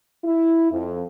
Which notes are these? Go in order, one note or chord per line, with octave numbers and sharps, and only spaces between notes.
E4
F2